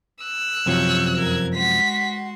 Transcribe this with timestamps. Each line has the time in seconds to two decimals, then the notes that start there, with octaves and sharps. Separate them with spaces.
0.24 E6 F#6
0.66 F#2 C3 F3 C#5 G6
1.16 F2 A#4 G#6
1.55 G#3 F#4 C6 B6